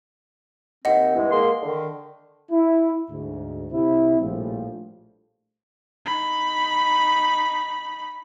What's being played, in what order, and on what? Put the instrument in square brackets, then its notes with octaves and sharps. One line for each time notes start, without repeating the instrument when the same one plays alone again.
[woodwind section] D#2 C4 [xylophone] D#5 F#5
[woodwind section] G2 E3 G#3
G#3 A#3 C6
D3 D#3
[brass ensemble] E4
D2 G#2
C3 E4
A#1 A2 F3 G3 A3
[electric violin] D#4 B5